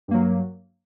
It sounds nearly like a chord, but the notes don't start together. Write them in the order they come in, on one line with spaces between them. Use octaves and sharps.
G2 A#3 F#3